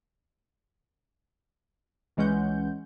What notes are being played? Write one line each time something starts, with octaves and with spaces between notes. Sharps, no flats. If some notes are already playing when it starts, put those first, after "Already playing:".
C#2 E3 G#3 C#4 F#5 G6